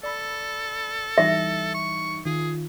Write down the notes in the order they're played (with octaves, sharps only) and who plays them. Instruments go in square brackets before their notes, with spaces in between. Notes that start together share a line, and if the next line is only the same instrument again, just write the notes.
[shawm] A4 [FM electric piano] D5 B5 E6
[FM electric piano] E3 G3 D#4 [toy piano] E5
[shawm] C#6
[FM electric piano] D#3 F4 [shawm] G#4